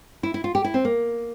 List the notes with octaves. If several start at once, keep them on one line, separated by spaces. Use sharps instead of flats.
E4
E4
F4
G4
E4
C4
A#3